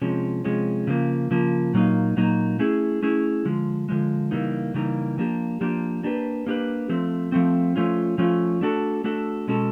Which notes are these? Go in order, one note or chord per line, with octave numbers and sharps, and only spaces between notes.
C3 F3 G#3 C#4
C3 F3 G#3 C#4
C#3 F3 A#3
C#3 F3 A#3
A#2 F#3 A#3 D#4
A#2 F#3 A#3 D#4
A3 C#4 E4 G#4
A3 C#4 E4 G#4
D3 F3 G#3
D3 F3 G#3
C#3 E3 G3 A#3 D#4
C#3 E3 G3 A#3 D#4
F3 A#3 D4 G4
F3 A#3 D4 G4
A#3 D4 G4 B4
A#3 D4 G4 B4
F3 A3 C4
F3 A3 C4
F3 A3 C#4 F4
F3 A3 C#4 F4
A3 D4 F#4 A4
A3 D4 F#4 A4
B2 G#3 C#4 F#4 A4